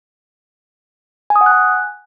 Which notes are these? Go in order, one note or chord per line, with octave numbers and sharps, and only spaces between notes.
G#5
D#6
F#5
F#6
G#5